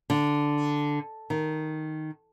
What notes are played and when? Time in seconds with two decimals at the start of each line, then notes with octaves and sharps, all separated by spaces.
0.10 D3
1.30 D#3